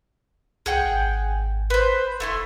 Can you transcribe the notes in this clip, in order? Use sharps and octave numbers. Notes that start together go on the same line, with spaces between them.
C2 G#4 F#5 G5
G#1
B4 C5
F1 A3 E4 C6